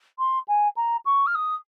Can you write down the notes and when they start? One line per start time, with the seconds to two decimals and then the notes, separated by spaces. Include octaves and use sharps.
0.19 C6
0.48 G#5
0.77 A#5
1.05 C#6
1.26 F6
1.35 D#6